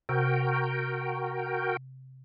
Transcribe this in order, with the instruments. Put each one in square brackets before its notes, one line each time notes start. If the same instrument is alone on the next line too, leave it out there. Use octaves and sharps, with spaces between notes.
[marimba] C3 [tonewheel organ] F#4 A#4 G5